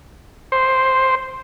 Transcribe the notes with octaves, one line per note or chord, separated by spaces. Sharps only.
C5